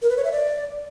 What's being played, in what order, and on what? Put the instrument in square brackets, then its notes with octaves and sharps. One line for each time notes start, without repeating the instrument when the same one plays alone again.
[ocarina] A#4
B4
C#5
E5
D5